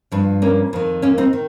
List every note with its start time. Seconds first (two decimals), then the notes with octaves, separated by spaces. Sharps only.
0.12 G2 F3
0.42 A#3 C#4
0.73 F2 D#3
1.02 A#3 C#4
1.18 C4 D#4
1.33 D#3